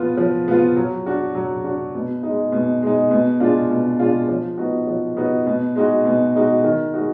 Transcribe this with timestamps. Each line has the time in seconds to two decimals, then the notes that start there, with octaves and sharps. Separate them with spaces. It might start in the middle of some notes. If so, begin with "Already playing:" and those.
Already playing: F3 B3 F4
0.17 F3
0.48 B3 F4
0.76 F#3
1.06 D4 F#4
1.35 F#3
1.64 D4 F#4
1.95 B2
2.23 D#4
2.28 G#3
2.52 B2
2.83 G#3 D#4
3.11 B2
3.40 G#3 D4 F4
3.70 B2
3.99 G#3 D4 F4
4.28 F3
4.58 B3 D#4 F#4
4.87 F3
5.17 B3 D#4 F#4
5.47 B2
5.76 G#3 D#4 F#4
6.05 B2
6.35 G#3 D#4 F#4
6.64 D#3
6.94 G#3 D#4 F#4